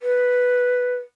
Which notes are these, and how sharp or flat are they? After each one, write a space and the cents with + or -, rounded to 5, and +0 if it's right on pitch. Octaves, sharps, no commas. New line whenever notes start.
B4 +0